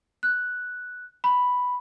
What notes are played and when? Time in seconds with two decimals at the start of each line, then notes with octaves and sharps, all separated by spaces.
0.23 F#6
1.24 B5